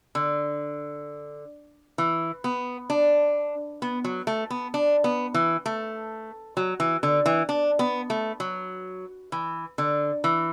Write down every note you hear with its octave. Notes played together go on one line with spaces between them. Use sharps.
D3
E3
B3
D4
B3
F#3
A3
B3
D4
B3
E3
A3
F#3
E3
D3
E3
D4
B3
A3
F#3
E3
D3
E3